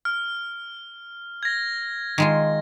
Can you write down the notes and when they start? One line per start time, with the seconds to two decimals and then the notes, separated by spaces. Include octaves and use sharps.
0.05 F6
1.43 G#6 A#6
2.18 D#3 G#3 F4